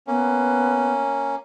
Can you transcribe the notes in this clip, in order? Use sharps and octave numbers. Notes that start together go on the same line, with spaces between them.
A#3 B3 C#4